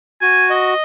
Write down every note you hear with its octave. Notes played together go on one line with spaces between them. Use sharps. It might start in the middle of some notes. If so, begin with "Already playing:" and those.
F#4 G#5
D#5